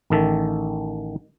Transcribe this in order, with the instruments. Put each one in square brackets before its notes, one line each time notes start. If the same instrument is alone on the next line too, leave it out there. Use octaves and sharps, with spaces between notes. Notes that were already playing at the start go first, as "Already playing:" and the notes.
[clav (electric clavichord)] A1 D#3 A4 E5